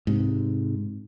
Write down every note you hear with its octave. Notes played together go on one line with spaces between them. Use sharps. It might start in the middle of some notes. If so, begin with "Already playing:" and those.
G#2 C3